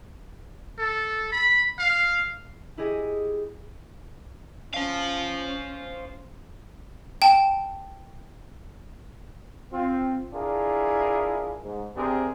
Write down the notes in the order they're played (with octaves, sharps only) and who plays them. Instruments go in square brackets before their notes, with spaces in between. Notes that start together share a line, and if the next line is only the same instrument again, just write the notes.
[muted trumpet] A4
B5
F5
[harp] E4 G4 G#4 D#5
[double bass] C#4 [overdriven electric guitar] C5 F5
[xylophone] G5 A5
[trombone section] C4 F4
D4 E4 F4 G#4 A#4
G#2
C3 C4 D4 G4 G#4 A#4